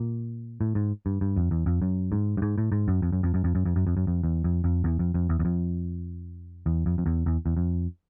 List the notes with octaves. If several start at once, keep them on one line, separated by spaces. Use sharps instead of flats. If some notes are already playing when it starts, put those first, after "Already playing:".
Already playing: A#2
A2
G#2
G2
G2
F2
E2
F2
F#2
G#2
G2
G#2
A2
G#2
F#2
F2
F#2
F2
F#2
F2
F#2
F2
F#2
F2
F#2
F2
E2
F2
F2
E2
F2
F2
E2
E2
F2
E2
F2
F2
E2
E2
E2
F2